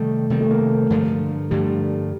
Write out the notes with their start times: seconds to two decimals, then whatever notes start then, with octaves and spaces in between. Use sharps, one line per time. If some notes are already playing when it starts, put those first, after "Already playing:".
Already playing: C3 D#3 G3 A3
0.30 C3 D#3 G3 A#3
0.41 A3
0.51 A#3
0.90 G2 D3 F3 A3
1.51 G2 D3 F3 G3 A3